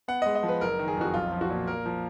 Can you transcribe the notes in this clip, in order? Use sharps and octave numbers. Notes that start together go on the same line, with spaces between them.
B3 F#5
G#3 D#5
D#5
F3
B4
F#1 A#4
D#3
G#4
F2 F#4
B1 F4
F3
F#4
A#2
A#3 A#4
F3